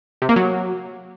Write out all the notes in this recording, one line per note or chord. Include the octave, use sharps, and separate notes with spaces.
C3
A#3
F#3